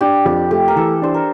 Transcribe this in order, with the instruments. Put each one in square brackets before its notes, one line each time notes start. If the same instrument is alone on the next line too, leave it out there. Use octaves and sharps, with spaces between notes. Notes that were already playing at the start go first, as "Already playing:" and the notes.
[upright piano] D4 [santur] G4
[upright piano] F2 [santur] G4
[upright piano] A3 [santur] G4
[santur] A#4
[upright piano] E3 [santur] A4
[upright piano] D4 [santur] C5
[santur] A#4